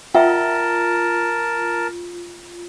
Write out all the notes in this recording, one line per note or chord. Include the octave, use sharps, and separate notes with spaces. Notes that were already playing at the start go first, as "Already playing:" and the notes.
F4 A#4 E5 F#5 G5 A5